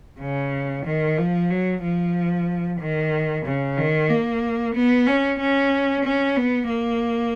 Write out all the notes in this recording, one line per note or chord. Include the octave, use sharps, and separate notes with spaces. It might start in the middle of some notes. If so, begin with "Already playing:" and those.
C#3
D#3
F3
F#3
F3
D#3
C#3
D#3
A#3
B3
C#4
C#4
C#4
B3
A#3